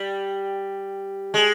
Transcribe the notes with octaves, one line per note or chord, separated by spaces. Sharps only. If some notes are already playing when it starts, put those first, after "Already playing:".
Already playing: G3
G#3